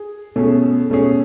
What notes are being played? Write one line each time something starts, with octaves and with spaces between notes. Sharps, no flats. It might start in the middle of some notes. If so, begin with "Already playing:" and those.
Already playing: G#4
B2 A3 C#4 G#4
B2 A3 C#4 G#4